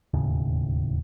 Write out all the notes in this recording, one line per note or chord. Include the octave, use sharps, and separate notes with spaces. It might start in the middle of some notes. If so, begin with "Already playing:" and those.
E1 D#2 A2 C#3